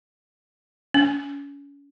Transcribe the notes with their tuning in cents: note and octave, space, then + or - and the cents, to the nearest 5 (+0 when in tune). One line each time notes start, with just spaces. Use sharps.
C#4 +35